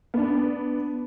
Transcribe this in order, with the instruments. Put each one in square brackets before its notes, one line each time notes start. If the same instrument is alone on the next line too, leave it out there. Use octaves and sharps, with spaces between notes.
[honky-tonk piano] B3 D4